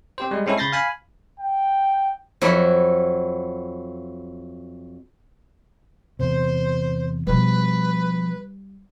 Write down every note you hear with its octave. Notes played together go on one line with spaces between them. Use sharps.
C4 G4 C5
G3 G#3
G#3 C4 C#4 E4 A4
C#3 B5 G6 A6 A#6 C7
F5 G#5 B5
G5
F2 F#3 E4 B5
E2 C3 C5
B2 F3 G3 B4